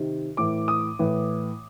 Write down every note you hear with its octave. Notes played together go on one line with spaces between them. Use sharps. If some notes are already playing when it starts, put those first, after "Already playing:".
Already playing: C3 D#3
A2 E3 D6
D#6
A2 E3